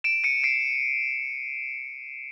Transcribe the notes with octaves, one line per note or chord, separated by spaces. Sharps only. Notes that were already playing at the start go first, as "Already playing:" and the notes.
D7 E7
C#7 D#7
C7 D7